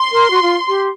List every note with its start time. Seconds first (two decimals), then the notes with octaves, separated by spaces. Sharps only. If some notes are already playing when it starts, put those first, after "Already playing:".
Already playing: C6
0.12 A#4
0.31 F#4
0.42 F4
0.68 G4